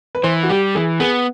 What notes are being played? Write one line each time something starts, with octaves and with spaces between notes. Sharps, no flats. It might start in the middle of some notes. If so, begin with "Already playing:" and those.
B4
E3 C5
F#4
G3 G4
E3 G#4
B3 G#4